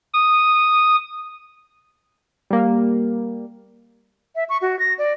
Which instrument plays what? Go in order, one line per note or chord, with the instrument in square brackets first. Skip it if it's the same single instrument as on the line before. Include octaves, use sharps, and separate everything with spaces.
[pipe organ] D#6
[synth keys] G3 A#3
[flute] E5
C#6
F#4
A#6
D5